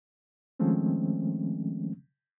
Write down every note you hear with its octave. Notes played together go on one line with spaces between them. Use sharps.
D#3 F3 G#3 A3 C4 C#4